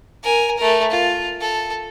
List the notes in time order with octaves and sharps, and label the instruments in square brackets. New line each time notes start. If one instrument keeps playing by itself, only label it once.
[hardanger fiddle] A#4 G#5
A3 A#4
F4
A4